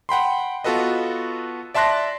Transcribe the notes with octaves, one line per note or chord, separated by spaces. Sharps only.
F#5 G5 B5 C6
B3 F4 F#4 A4 B4 D#5
D5 E5 A5 C6 F#6 A#6